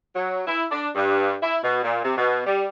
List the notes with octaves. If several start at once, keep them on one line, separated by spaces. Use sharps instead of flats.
F#3
E4
D4
G2
E4
B2
A#2
C3
B2
G3